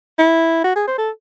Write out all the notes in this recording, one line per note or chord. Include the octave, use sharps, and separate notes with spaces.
E4
F#4
G#4
C5
A4